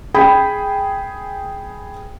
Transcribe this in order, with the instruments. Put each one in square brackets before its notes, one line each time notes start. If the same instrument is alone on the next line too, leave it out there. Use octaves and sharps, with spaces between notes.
[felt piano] G#4 G5 B5